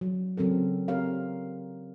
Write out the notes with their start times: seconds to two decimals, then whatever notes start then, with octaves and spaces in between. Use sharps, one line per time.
0.01 F#3
0.37 C#3 F#3 C4 A4 A#4
0.88 C4 G4 A#4 C#5 F5